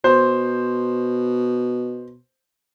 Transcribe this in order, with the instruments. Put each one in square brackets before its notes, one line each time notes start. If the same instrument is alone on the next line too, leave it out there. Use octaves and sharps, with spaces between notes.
[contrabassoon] B2 [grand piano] C5